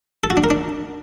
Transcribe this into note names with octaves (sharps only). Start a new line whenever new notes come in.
A4
F#4
D4
A#4
D4